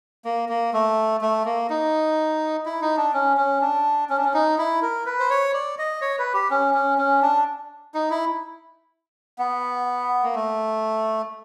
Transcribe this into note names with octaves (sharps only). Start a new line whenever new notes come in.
A#3
A#3
A3
A3
A#3
D#4
E4
D#4
D4
C#4
C#4
D4
C#4
D4
C#4
D#4
E4
A#4
B4
C5
C#5
D5
D#5
C#5
B4
G4
C#4
C#4
C#4
D4
D#4
E4
B3
A#3
A3